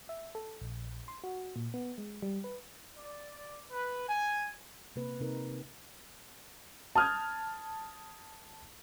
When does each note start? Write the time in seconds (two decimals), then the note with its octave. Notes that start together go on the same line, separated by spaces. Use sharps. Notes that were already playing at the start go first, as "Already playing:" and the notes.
0.09 E5
0.35 A4
0.61 A#1
1.08 C6
1.24 F#4
1.56 A#2
1.74 B3
1.98 G#3
2.22 G3
2.44 B4
2.98 D5
3.71 B4
4.08 G#5
4.96 C3 A#3 B4
5.20 C3 D#4 A#4
6.95 A5 D#6 F6 G6 G#6